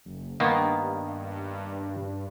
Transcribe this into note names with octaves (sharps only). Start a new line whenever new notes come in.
F#1
G2 D#3 A#3 B3